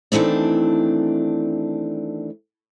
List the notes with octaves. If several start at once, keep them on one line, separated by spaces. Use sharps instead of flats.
D#3 E3 A3 C4 D4